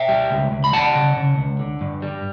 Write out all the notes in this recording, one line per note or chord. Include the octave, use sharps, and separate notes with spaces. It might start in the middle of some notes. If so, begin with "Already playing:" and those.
Already playing: E5 G5
G3
C#2
C#2
B5
G3 F#5 A5
C#3
C#3
C#2
D3
G2
G3